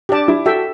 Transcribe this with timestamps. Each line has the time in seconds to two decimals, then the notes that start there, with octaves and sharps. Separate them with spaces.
0.09 D4 G4 D5 A5
0.28 E4
0.46 F#4 A4 E5 G5